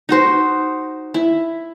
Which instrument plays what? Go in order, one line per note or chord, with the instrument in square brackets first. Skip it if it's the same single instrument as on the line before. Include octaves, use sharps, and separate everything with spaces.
[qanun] D#4 F#4 C5
E4